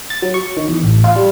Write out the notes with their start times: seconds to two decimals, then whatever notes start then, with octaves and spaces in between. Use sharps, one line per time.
0.10 A6
0.22 F#3
0.34 C#6
0.57 D#3
0.68 E2
0.84 A1
1.04 F4
1.16 G3